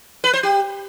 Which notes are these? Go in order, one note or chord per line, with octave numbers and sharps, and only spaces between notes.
B4
C5
G4